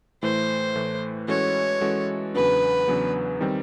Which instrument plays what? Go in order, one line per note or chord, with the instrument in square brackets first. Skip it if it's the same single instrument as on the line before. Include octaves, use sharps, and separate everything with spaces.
[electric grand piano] A2 E3 A3 [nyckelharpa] C5
[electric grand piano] A2 E3 A3
[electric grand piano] E3 G#3 C#4 F#4 A4 [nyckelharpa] C#5
[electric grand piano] E3 G#3 C#4 F#4 A4
[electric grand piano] E2 C#3 F#3 B3 D4 [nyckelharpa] B4
[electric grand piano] E2 C#3 F#3 B3 D4
D#3 G3 C4